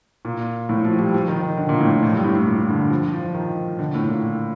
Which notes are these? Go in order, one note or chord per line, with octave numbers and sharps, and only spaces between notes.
A#2
A2
F3
G3
F3
D#3
D#3
D3
A#2
A2
A#2
A2
G2
A2
A2
A#2
D3
F3
F3
D#3
D3
A2
A#2